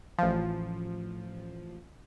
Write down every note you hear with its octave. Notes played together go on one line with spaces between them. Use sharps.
A1 F3